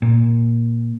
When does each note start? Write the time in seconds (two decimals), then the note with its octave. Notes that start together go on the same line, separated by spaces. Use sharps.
0.02 A#2